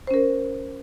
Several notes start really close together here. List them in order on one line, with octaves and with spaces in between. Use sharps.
C5 C#4 A#4